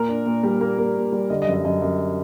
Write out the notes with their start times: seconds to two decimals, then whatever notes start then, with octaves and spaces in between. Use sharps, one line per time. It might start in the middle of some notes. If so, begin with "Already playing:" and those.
Already playing: A#2 A#4
0.08 D4
0.26 A#2
0.43 G3
0.61 A#3
0.78 A#3
0.96 A#2
1.12 G3
1.30 D3 D#5
1.42 D#5
1.47 F#2
1.54 D#5
1.65 F#2 D#5
1.82 F#2